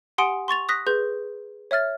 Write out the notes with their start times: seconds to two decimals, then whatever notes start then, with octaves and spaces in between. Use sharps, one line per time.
0.18 G4 F#5 G#5 C6 D#6 D7
0.48 C6 C#6 A6 F7
0.69 D#6 F#6 A#6 B6
0.87 G#4 B4 C6 G6
1.71 C#5 E5 F6 A6